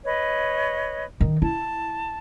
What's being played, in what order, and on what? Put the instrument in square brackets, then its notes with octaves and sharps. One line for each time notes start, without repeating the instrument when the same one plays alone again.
[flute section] B4 C#5 D#5
[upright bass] D#3
[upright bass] E4 [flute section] A5